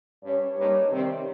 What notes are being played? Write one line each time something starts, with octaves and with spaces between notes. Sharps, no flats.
G2 G3 C#4 C#5
G2 G3 A#3 D#4
C3 D#3 G3 C4